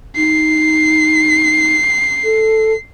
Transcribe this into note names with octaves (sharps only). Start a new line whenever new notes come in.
D#4 C7
A4